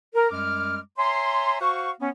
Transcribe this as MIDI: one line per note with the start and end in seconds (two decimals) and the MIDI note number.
0.15 0.31 70
0.31 0.79 42
0.31 0.79 55
0.31 0.79 56
0.31 0.79 86
0.31 0.79 89
0.98 1.58 73
0.98 1.58 76
0.98 1.58 80
0.98 1.58 82
0.98 1.58 84
1.61 1.91 66
1.61 1.91 72
1.61 1.91 77
1.61 1.91 78
1.61 1.91 85
2.01 2.09 59
2.01 2.09 61